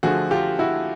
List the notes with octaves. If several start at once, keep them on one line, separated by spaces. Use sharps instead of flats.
D3 F3 A3 F#4 G#4
F4 G4
E4 F#4